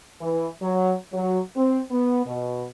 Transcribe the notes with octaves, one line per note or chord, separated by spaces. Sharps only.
E3
F#3
F#3
C4
B3
B2